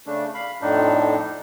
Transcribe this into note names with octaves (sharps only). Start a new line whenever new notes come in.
C#3 A3 D4
F5 B5
F2 A2 D4 D#4